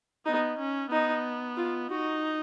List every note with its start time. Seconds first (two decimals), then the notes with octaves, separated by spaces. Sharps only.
0.25 B3 D#4
0.59 C#4
0.91 B3 D#4
1.57 F4
1.90 D#4 F#4